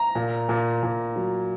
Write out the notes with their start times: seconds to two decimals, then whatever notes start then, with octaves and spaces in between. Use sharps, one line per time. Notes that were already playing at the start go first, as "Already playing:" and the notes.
Already playing: A#5
0.15 A#2
0.49 A#2
0.83 A#2
1.16 F#3